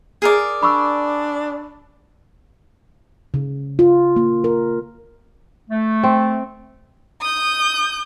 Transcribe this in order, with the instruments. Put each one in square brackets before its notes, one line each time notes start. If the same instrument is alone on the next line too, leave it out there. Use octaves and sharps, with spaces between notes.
[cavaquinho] G#4 A#4 D5
[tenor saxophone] D4 [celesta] B5 C#6 E6
[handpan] C#3
F4
A#3
A#4
[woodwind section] A3
[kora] C4
[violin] D#6 G6